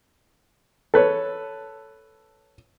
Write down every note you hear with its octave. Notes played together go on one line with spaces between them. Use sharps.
A4 B4 C#5